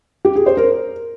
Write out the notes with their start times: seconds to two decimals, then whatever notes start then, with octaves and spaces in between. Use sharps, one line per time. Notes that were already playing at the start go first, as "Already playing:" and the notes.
0.25 G4
0.35 G#4
0.46 C5
0.57 A#4